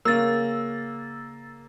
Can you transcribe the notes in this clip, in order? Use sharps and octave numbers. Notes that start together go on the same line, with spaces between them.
C#3 F#3 A#3 E6 A6